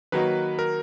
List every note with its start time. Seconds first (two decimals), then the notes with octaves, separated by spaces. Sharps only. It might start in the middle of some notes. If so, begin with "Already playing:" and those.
0.12 D#3 F#3 A#3 D#4 F#4 B4
0.59 A#4